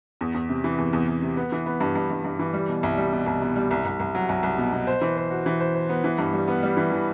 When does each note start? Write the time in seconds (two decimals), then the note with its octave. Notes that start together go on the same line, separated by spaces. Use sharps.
0.21 E2
0.34 E2
0.49 C3
0.64 E3
0.78 E2
0.93 E2
1.08 E2
1.22 C3
1.36 B3
1.52 E3
1.66 B3
1.80 G2
1.95 G2
2.10 G2
2.24 G2
2.39 E3
2.53 G3
2.69 B2
2.83 C2
2.97 G3
3.13 B2
3.26 C2
3.42 B2
3.56 G3
3.71 C2
3.85 C2
4.00 C2
4.15 F#3
4.29 C2
4.43 C2
4.58 B2
4.73 B2
4.87 C5
5.01 E3
5.17 C5
5.31 F#4
5.46 E3
5.60 C5
5.75 C5
5.89 B3
6.04 E3
6.18 G2
6.33 G3
6.48 B3
6.63 G3
6.77 E3
6.92 E3